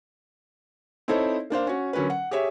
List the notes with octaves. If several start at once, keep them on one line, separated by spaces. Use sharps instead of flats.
C4 D#4 E4 A4 C5 C#5
A#3 D4 C5 F5
C#4 F#4
D3 F#3 C#4 A#4 B4
F#5
G4 G#4 C#5 E5